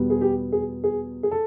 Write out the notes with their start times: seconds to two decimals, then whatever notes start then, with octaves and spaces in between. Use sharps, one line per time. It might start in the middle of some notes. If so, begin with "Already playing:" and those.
Already playing: E2 B2 G3 B3
0.10 G#4
0.21 G4
0.52 G#4
0.84 G#4
1.23 G#4
1.31 A4